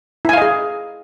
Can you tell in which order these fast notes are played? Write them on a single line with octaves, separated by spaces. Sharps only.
E4 G#5 F5 D#5 G#4